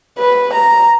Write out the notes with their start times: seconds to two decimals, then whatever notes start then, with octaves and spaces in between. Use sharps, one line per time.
0.19 B4
0.54 A#5